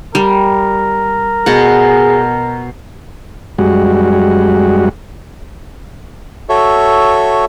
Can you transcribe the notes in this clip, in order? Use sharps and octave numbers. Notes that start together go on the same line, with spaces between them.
G3 A#4
B2 G#4 F#5
F#2 G3 G#3 F#4
F#4 A4 C#5 E5